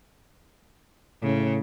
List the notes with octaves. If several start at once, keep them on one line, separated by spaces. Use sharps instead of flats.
A2 C#3